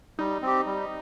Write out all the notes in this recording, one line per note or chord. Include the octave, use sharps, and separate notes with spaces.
G3 D#4
C4 G4
G3